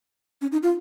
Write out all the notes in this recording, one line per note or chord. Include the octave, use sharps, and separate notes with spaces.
C#4
D#4
F4